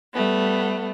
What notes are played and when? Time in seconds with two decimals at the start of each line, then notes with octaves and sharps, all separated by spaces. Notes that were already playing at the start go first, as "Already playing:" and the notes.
0.13 G3 A3 B3